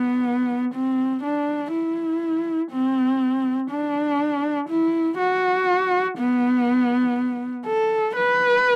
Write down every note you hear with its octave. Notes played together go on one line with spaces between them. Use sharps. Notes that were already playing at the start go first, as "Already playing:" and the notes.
Already playing: B3
C4
D4
E4
C4
D4
E4
F#4
B3
A4
B4